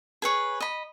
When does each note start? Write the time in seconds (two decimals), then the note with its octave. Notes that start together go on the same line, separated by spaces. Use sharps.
0.22 G#4 B4 C#5
0.61 D#5 B5